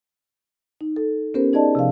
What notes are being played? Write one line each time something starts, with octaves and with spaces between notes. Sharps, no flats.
D#4
A4
B3 C#4 G4 A#4 C5
D#4 G#4 D5 D#5 A5
C3 F3 F5